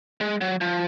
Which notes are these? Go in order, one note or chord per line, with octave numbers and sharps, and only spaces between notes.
G#3
F#3
F3